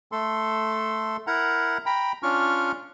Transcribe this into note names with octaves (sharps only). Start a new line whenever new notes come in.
A3 A4 C6
E4 A#4 F#5 A#5
G5 A#5 B5
C#4 D4 F4 C#6 F6